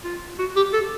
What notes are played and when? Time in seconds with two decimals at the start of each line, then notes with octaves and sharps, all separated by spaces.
0.04 F4
0.39 F#4
0.56 G4
0.73 A4